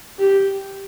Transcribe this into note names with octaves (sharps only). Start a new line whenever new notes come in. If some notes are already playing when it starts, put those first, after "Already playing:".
G4